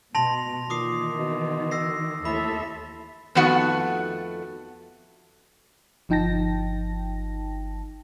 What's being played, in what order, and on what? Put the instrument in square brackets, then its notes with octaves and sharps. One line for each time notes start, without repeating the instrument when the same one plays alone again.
[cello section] B2 [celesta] A5 [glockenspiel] C6 A#6 F7
[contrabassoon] A#2 [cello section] D#3 E3 [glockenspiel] D6 D#6 C7
[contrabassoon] B2
[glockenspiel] E6 A#6 C7
[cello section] D#2 A4 E5 [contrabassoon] A2 [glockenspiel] B5
[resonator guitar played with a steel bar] F2 D#3 A3 B3 F#4 F#5
[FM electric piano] G1 F3 D#4 G5 A5 A#6